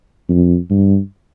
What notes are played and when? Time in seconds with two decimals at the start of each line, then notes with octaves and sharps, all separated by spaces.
0.29 F2
0.70 G2